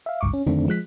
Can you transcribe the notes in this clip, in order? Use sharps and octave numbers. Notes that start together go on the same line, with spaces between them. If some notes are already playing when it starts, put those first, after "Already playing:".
E5 F5
G#1 C#2 G2 C#6 D6
C#4
F2 D3 D#3 A3 C4 D4
F3 G#3 F#6 B6